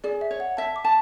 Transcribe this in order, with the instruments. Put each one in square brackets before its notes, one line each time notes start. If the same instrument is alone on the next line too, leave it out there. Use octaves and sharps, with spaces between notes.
[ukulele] G#4 [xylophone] D5
[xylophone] E5
[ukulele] C#5
[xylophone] F#5
[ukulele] E5 [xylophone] A5
[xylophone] D6
[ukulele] A5